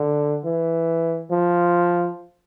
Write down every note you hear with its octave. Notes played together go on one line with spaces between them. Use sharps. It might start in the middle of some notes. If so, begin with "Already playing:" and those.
Already playing: D3
E3
F3